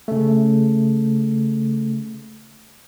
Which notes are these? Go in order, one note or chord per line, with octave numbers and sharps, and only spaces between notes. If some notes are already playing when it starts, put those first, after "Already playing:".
C#3 A3